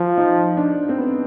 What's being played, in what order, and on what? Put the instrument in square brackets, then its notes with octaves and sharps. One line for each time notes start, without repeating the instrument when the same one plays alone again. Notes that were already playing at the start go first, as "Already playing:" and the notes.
Already playing: [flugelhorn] F3 [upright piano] F4
[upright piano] D#4
D4
C4
B3